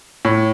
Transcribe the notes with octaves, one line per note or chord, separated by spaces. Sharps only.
A2